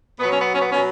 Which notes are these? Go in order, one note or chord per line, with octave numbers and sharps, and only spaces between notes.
B2 F#3 B3
C#4
B3
C#4
B3
B2 F#3 C#4